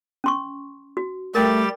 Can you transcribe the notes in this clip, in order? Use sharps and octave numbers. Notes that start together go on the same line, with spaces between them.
C#4 C6 C#6
F#4
G3 A3 G4 A#4 G5 A6